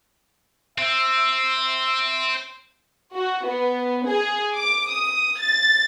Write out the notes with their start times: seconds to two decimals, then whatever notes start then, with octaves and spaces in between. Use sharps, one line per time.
0.78 C4 E5
3.16 F#4
3.46 B3
4.07 G#4
4.56 D6
4.91 D#6
5.40 A6